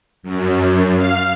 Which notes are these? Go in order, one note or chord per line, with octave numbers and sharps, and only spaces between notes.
F#2
F5